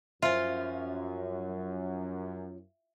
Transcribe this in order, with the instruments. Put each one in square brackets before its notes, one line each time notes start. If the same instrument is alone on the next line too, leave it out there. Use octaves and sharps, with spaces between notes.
[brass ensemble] F#2 [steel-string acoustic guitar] F3 C#4 [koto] F4 [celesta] E5